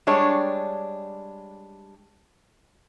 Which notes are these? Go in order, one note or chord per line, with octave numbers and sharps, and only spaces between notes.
G3 G#3 D4 C#5